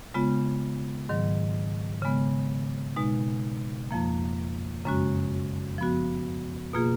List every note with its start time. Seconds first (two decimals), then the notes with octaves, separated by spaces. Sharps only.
0.14 C#3 G#3 B3 F4
1.09 G#2 D#3 F#3
2.02 C#3 G#3 B3
2.96 B2 G#3 D#4
3.91 F2 F3 A#3
4.85 F#2 C#3 G#3 C#4 F#4
5.78 F3 B3 F#4
6.73 B2 A#3 F4 G#4